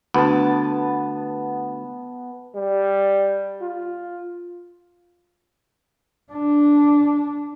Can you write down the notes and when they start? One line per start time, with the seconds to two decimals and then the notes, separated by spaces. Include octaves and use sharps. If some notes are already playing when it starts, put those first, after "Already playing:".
0.14 D2 B3 A5
2.55 G3
3.61 F4
6.32 D4